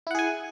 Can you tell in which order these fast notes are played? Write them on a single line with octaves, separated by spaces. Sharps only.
E4 F#5 G#4 G#5